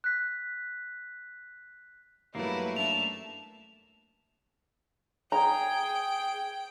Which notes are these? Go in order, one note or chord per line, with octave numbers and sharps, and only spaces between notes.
F#6 B6
G2 E3 F#3 A3 A#3 E4 B4
F#2 D4 E5 A5 F7
G#4 G5 A#5